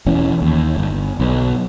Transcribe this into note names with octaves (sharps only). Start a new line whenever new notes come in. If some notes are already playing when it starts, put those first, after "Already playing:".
E1 E3 C#4
D#2
G1
B1